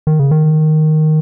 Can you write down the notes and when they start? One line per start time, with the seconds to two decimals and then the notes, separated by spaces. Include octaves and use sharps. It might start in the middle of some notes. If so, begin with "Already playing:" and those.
0.07 D#3
0.19 C#3
0.31 D#3